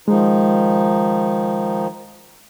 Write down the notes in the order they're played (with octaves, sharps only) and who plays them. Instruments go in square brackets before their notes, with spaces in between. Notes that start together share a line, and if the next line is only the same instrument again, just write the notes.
[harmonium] D#3 F3 D#4 [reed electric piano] G#3